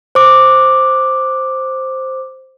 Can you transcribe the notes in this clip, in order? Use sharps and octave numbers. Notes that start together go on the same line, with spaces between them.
C5 D6